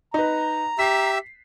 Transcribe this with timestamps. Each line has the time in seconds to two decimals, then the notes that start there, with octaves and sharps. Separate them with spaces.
0.14 D#4 B4 A#5
0.79 G4 E5 E6 B6 C7